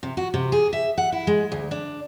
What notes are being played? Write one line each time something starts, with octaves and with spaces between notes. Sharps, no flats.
C3
F#4
C3
G#4
E5
F#5
E4
G#3
D2
D4